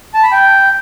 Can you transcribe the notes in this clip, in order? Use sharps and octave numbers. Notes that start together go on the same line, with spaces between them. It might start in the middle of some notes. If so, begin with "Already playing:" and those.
A5
B5
G5